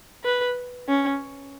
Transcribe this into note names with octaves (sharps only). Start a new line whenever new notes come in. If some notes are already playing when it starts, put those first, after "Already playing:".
B4
C#4